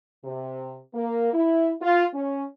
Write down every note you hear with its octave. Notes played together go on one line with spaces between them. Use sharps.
C3
A#3
E4
F4
C#4